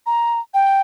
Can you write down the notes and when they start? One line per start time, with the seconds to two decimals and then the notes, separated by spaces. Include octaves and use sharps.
0.06 A#5
0.54 G5